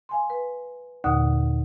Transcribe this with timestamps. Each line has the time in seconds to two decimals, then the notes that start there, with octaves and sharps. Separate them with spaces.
0.09 F5 G#5 C6
0.30 B4
1.04 D#2 A#2 D3 F#5 D#6 F#6